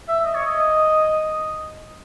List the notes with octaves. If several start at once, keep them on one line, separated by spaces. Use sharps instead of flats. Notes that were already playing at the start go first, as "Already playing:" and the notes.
E5
D#5
C#5
D#5